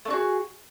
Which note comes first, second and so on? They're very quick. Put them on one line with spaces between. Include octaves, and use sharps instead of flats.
A3 D4 F#4 G#4